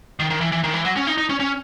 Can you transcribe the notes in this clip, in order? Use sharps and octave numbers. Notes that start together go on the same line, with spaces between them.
D#3
D#3
E3
E3
D#3
E3
F#3
C#4
D#4
D#4
C#4
C#4